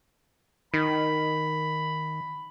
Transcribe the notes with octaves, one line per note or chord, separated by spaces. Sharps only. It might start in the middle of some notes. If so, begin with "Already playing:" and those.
D#3 B5